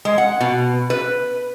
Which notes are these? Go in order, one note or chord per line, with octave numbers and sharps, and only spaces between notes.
G#3
F#5
B2
B4